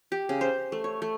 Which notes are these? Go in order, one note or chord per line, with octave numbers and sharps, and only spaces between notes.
G4
C#3
C5
A3
C#5
A3